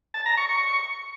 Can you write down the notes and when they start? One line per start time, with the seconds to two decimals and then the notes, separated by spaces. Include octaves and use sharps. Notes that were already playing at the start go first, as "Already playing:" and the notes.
0.14 A5
0.26 A#5
0.37 C#6
0.49 C#6